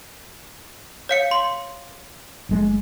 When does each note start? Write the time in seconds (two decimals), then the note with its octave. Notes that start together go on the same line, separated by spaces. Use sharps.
1.09 C#5 F5 C#7
1.31 C6 F#7
2.49 F#1 G#3 A3